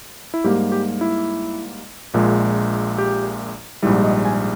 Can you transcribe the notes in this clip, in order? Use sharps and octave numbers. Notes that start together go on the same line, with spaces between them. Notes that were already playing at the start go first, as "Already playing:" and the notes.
E4
G#2 G3 A#3 G4
G4
E4
A#1 A#2 G#3
G4
A#1 G#2 G3 E4
D#5
G#5